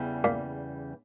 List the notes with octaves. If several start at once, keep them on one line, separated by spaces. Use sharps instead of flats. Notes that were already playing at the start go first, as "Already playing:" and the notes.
Already playing: E2 C#3 E3 G3
A#2